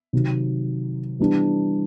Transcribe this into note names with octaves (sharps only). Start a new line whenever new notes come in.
C3 D#3 F#3
E3 G3 B3 D4